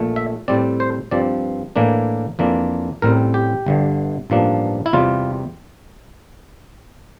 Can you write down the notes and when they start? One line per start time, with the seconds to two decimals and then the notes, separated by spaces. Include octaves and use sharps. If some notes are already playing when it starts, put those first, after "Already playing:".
Already playing: A#1 A#2 A3
0.16 E5
0.48 A2 G3 C4 D5
0.80 C5
1.11 G2 F3 C4 D5
1.76 A2 E3 A#3 D4
2.39 F2 E3 A#3 D4
3.02 A1 A2 G3 C4 A#4
3.34 G4
3.66 G1 G2 D3
4.30 A1 G2 F3 A#3 D4
4.86 E4
4.93 E2 C3 G3 C4 F4